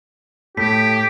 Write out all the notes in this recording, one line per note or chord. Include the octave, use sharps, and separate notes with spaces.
A2 G4 B6